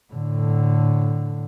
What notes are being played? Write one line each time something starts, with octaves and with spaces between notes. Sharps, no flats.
A2 D3